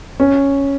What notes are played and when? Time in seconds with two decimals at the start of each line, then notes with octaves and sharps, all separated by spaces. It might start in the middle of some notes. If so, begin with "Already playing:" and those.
0.20 C#4